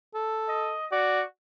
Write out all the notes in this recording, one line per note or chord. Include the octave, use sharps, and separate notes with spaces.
A4
D#5
F#4 D5